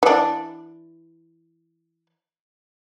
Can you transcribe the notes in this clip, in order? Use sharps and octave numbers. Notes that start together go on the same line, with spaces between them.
E3 D4